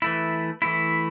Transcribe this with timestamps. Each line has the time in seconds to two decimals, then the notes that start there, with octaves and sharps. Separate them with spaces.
0.02 E3 A3 E4
0.62 E3 A3 E4